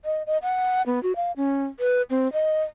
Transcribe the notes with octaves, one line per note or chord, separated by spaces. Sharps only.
D#5
D#5
F#5
B3
F#4
F5
C#4
B4
C4
D#5